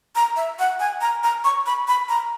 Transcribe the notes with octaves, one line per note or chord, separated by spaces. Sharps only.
A#5
E5
F#5
G#5
A#5
A#5
C#6
B5
B5
A#5